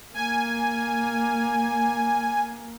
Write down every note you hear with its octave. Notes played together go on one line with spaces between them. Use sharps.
A#3 G#5